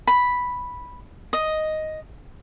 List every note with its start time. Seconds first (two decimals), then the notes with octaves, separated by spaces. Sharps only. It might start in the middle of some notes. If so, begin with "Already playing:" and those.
0.07 B5
1.33 D#5